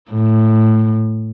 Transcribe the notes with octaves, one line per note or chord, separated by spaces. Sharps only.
A2